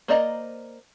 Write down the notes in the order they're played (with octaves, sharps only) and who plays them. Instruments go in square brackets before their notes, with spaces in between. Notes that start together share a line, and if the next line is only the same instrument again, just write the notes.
[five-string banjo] A#3 C5 D5 D#5 A#5